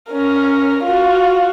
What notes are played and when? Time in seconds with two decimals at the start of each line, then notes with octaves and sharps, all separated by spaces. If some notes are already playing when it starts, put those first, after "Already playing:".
0.11 C#4 A#4
0.84 F4 F#4